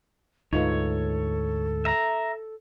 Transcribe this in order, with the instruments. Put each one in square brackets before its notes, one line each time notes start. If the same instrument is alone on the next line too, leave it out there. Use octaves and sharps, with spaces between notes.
[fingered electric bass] D2 G#2 [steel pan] D#4 F4 B4 [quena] A4 [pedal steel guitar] C#5
[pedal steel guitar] E5 A#5